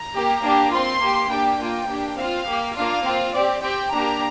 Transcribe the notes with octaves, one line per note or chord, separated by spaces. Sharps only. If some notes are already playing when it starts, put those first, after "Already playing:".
Already playing: A#5
A#3 G4
A#3 D4 G4
C4 F4 C6
A#3 G4
A#3 D4 G4 G5
A#3 F4
A#3 D4 G4
C4 F4 F5
A#3 G4
A#3 D4 F4 F5
C4 F4
C4 G4 D5
C4 G4 G5
A#3 D4 G4 A#5